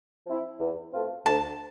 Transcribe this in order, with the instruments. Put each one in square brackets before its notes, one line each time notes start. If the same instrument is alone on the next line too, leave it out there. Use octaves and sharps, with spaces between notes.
[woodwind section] F3 C4 E4
E2
B2 A3 C4 F4
[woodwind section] D2 [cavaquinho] A5